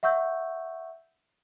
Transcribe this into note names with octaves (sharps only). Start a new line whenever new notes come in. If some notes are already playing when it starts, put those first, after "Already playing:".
E5 F#5 C#6 E6 G6